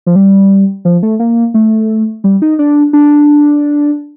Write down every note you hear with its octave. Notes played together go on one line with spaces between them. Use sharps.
F3
G3
F3
A3
A#3
A3
G3
D#4
D4
D4